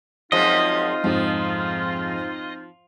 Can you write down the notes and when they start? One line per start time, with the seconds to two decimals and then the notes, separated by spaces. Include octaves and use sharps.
0.32 F#2 F3 G#3 C4 D#4 F4 D#5
1.04 F2 G#2 F3